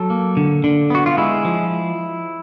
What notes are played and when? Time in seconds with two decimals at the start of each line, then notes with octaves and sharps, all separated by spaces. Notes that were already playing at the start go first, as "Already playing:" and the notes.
Already playing: F#3 A4
0.10 A#3
0.37 D3
0.64 D3
0.90 B3 F#4
1.06 F4
1.17 G#3 E4
1.45 F3